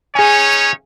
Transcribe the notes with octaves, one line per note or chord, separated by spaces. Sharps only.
C#4 D#4 G#4 C#5 G#5